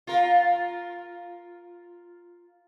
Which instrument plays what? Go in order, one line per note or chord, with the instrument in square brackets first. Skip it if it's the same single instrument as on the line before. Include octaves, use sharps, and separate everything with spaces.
[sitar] F4 A#4